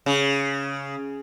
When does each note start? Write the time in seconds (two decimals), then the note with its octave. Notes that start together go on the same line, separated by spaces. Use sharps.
0.06 C#3